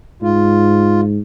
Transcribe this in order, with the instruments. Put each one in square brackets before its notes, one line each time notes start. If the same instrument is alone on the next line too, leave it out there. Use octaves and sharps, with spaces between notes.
[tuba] G#2 [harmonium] F4